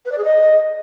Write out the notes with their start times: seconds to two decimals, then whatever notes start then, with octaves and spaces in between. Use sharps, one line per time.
0.05 B4
0.12 D5
0.18 G#4
0.24 D#5